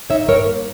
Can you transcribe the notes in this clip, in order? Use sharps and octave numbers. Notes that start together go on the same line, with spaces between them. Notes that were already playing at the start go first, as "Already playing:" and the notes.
D#4 C#5 E5
G2 A#4 C#5
A#3